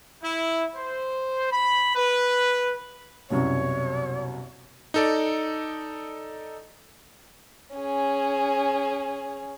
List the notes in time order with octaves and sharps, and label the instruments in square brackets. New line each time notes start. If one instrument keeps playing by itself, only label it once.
[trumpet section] E4
C5
B5
B4
[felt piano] C2 F#2 B2 [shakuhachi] C#5
[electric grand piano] D#4 A4 D5
[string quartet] C#4 G#4